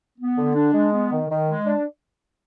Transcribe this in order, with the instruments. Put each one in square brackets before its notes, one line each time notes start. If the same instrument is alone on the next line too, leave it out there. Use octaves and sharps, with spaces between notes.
[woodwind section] B3
D3
D4
G#3
B3
D#3
D#3
G#3
D4